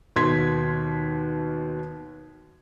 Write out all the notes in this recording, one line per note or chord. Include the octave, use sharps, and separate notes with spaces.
D#2 B2 C6 G#6 B6